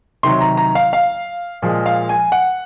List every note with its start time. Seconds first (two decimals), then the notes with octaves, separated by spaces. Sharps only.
0.23 C3 D#3 F#3 C6
0.41 A#5
0.57 A#5
0.75 F5
0.93 F5
1.62 A#2 F3 G#3
1.86 F5
2.09 G#5
2.32 F#5